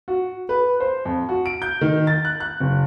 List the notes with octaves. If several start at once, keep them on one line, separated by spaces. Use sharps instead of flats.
F#4
B4
C5
F2
F#4
D7
G6
D#3
A6
F#6
F#6
F#1